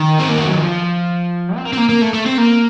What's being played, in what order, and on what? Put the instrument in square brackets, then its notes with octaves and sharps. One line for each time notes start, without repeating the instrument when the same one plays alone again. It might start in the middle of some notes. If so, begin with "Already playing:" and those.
Already playing: [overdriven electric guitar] D#3
C4
A#3
A3
F#3
F3
C4
A#3
C4
A#3
A#3
A3
A3
C4
A#3